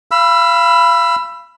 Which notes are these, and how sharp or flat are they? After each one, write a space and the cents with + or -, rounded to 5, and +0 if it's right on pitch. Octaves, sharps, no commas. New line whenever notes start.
F5 -30 B5 +0 E6 +20